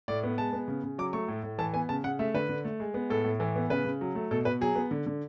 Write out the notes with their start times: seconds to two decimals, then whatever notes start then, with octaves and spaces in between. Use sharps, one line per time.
0.08 A2 D5
0.23 B3
0.38 G#3 A5
0.53 B3
0.68 C#3
0.83 C#3
0.98 F#3 D6
1.13 A3 C#6
1.28 A2
1.43 A2
1.59 E3 A5
1.73 B3 G#5
1.89 C#3 A5
2.04 C#3 F#5
2.19 A3 E5
2.34 D3 B4
2.49 D3
2.65 A3
2.80 G#3
2.94 B3
3.10 A2 A4
3.24 A2
3.40 E3
3.56 B3
3.70 C#3 B4
3.85 C#3
4.01 F#3
4.15 A3
4.31 B2 A4
4.45 B2 B4
4.61 F#3 G#4
4.75 B3
4.91 D3
5.06 D3